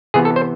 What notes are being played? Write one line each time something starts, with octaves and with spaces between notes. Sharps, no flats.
C3 E3 B3 G#4
A4
C5